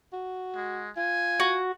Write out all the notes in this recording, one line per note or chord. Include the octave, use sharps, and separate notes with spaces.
F#4
G#3
F4 G#5
F#4